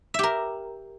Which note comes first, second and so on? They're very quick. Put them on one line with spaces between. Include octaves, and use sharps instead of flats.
E5 G4 A#4